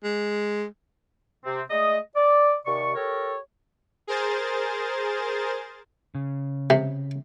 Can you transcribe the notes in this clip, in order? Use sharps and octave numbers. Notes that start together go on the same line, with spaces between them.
G#3
C3 C4
G#3 A3 D5 D#5
D5
D#2 C3 D5 C#6
G4 A4 A#4 C#5
G#4 A#4 C5 A6
C#3
C3